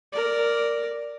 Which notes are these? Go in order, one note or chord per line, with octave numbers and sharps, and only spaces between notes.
A#4 D5